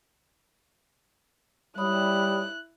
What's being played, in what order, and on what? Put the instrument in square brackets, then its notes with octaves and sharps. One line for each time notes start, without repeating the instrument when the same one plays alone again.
[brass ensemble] G3 [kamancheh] E4 F#6 [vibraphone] C#5 B5 D#6